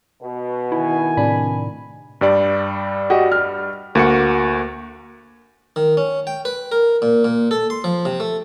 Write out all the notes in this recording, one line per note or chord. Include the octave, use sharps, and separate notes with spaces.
B2
D#3 E4 G#5
A2 C3 D4 B5
G2 G3 D5
F#4 G4 D#5
F6
D2 A#3 F#4 C#7
D#3
C#4
G5
B4
A#4
A#2
A#2
A4
C6
F3
C3
A3